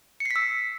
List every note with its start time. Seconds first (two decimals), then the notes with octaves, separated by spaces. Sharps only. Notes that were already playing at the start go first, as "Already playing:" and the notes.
0.20 C#7
0.25 C7
0.31 B6
0.36 E6